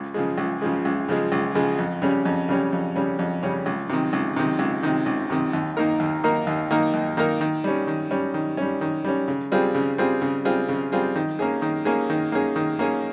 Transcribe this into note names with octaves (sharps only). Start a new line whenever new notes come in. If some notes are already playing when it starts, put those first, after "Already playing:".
Already playing: C#2
C#3 F3 G#3
C#2
C#3 F3 G#3
C#2
C#3 F3 G#3
C#2
C#3 F3 G#3
F2
C#3 G3 C#4
F2
C#3 G3 C#4
F2
C#3 G3 C#4
F2
C#3 G3 C#4
C#2
C3 D#3
C#2
C3 D#3
C#2
C3 D#3
C#2
C3 D#3
D#2
D#3 A#3 D#4 A#4
D#2
D#3 A#3 D#4 A#4
D#2
D#3 A#3 D#4 A#4
D#2
D#3 A#3 D#4 A#4
D#3
G3 C#4
D#3
G3 C#4
D#3
G3 C#4
D#3
G3 C#4
C#3
G3 C4 F4 G#4
C#3
G3 C4 F4 G#4
C#3
G3 C4 F4 G#4
C#3
G3 C4 F4 G#4
D#3
A#3 C#4 G#4
D#3
A#3 C#4 G#4
D#3
A#3 C#4 G#4
D#3
A#3 C#4 G#4